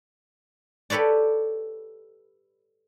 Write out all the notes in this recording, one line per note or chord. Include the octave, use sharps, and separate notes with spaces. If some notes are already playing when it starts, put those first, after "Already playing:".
G4 A4 B4 C#5 D5